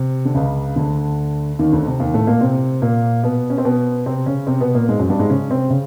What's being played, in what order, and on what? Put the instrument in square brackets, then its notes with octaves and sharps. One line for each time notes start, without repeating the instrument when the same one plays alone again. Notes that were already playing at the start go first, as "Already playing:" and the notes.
Already playing: [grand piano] C3
D3
C#2 C#3
D2 D3
D#2 D#3
D2 D3
C3
D#2 D#3
A2 A3
A#2 A#3
C3 C4
A#2 A#3
B2 B3
C#4
C4
B2 B3
C3 C4
C#3 C#4
C3 C4
B2 B3
A#2 A#3
G#2 G#3
F#2 F#3
G2 G3
G#2 G#3
C#3 C#4
C3 C4
C#3 C#4